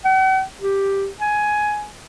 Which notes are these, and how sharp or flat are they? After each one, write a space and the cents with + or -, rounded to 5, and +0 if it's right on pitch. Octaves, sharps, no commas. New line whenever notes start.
F#5 +45
G4 +5
G#5 +10